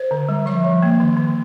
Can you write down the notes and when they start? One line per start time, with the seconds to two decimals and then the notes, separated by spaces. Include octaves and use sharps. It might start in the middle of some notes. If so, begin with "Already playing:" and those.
Already playing: C5
0.11 D3
0.29 G3
0.46 F3 E5
0.64 F3
0.82 A#3
1.00 D#3
1.17 D#3